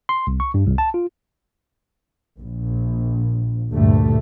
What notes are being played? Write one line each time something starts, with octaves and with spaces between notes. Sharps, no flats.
C6
C2
C#6
G2
C2
A5
F4
A#1
D2 G2 A#2 G3 A3